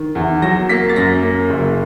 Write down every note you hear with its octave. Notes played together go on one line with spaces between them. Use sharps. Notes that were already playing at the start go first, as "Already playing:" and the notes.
Already playing: D#3
E2
F#3 A#6
A#3 B6
A6
F#2 A#6
A#3
F#1